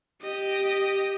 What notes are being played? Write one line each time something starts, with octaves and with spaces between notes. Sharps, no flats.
G4 D#5